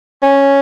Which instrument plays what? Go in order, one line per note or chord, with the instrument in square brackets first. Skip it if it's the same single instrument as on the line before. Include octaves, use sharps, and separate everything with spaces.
[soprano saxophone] C#4